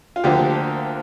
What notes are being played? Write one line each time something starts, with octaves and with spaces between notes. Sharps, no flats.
F4
D2 D3 F3 A#3 G4